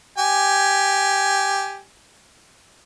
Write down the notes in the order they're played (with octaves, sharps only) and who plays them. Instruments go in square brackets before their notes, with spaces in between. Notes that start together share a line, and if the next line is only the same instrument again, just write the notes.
[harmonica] G4 G#5